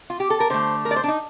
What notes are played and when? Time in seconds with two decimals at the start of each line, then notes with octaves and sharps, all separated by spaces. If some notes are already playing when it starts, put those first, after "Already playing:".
0.10 F4
0.20 G4
0.30 A4
0.40 A#4
0.50 D3 A3 C5
0.85 A#4
0.91 D5
0.96 C5
1.04 D4
1.08 D#4